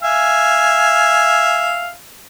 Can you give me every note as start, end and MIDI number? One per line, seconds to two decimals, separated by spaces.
0.02 1.94 76
0.02 1.94 77
0.02 1.94 80